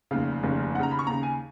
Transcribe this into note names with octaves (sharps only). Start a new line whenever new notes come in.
F1 D#2 C#3 F5
F1 D#2 C#3
D#2 C#3 F#5 A#5
B5
C#6
D#2 C#3 A#5
G#5